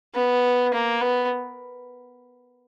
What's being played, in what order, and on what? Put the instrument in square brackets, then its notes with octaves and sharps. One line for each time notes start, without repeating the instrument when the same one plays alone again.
[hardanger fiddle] B3
A#3
B3